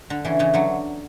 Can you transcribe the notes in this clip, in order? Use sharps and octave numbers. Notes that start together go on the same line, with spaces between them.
D3
C#3 E3
C#3 E3
D3 F#3